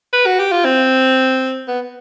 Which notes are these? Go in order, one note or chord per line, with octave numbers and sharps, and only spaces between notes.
B4
F#4
G4
F4
C4
B3